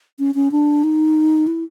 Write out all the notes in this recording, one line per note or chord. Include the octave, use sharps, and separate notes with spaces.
C#4
C#4
D4
D#4
E4